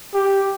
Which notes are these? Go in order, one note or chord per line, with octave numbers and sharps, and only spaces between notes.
G4